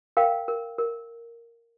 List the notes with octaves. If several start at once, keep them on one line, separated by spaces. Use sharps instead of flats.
A#4 F5 G5
A#4
A#4